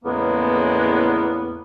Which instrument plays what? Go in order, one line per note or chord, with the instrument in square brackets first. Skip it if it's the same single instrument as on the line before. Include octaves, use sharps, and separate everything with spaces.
[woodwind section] E2 A2 C#3 G#3 A#3 B3